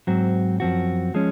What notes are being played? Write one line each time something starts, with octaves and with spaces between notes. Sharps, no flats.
G#2 F#3 C4 F#4
F#2 F3 C4 F#4
F3 G#3 C#4